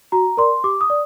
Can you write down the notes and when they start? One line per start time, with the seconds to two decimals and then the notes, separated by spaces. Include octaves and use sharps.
0.12 F#4 A#5
0.37 A#4 D5 C6
0.64 G4 D6
0.81 D#6
0.90 D5